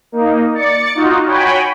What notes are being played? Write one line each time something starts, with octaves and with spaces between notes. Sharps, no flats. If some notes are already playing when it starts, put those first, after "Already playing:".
A#3 D#4
D5 A6 C#7
D#4 F4 F#4
F#4 C#5 G5 G#5 B5